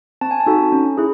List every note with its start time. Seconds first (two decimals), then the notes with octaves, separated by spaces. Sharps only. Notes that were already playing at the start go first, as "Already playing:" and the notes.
0.21 C4 A5
0.31 G#5
0.40 A5
0.47 D#4 F#4 A4
0.72 C#4
0.97 E4 G#4